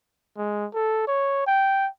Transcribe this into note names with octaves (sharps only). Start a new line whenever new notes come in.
G#3
A4
C#5
G5